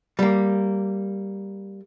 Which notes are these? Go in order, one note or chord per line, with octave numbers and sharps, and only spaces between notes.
G3 A#3